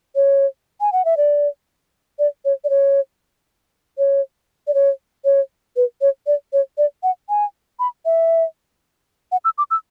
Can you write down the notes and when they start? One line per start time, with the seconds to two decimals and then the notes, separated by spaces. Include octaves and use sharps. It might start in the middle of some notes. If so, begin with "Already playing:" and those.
0.15 C#5
0.81 G#5
0.93 F#5
1.05 E5
1.17 D5
2.19 D5
2.45 C#5
2.64 D5
2.70 C#5
3.98 C#5
4.67 D5
4.74 C#5
5.25 C#5
5.76 B4
6.01 C#5
6.27 D5
6.53 C#5
6.78 D5
7.03 F#5
7.29 G#5
7.79 B5
8.05 E5
9.32 F#5
9.45 E6
9.58 D6
9.71 E6